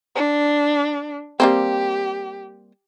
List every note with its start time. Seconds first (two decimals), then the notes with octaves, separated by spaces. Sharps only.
0.15 D4
1.40 G3 A#3 C4 G4